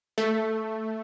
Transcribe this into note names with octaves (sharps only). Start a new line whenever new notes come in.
A3